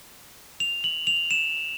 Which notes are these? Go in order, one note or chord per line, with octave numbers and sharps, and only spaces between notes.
F7
F#7
F7
E7